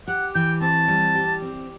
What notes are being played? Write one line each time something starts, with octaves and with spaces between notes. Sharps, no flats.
G4 F#5
E3 G5
C4 A5
G3
G4
C4